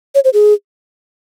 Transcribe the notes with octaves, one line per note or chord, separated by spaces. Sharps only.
C#5
C5
G#4